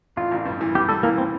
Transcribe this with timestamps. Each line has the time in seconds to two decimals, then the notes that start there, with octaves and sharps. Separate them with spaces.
0.17 A1 F4
0.31 A1
0.46 G2
0.61 E3
0.75 G2 G4
0.89 G3 A4
1.03 E3 A#3
1.18 C4